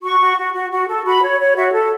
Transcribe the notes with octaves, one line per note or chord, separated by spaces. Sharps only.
F#4 C#6
F#4
F#4
F#4
F#4
A4
F#4 B5
C#5
C#5
F#4 E5
A4